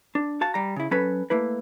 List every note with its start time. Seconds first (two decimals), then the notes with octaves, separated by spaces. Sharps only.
0.15 D4
0.41 F#4 F5 A5
0.54 G3 A#5
0.76 C#3 E4
0.91 F#3 C#4 A4 B4 B5
1.30 A3 A#3 E4 B4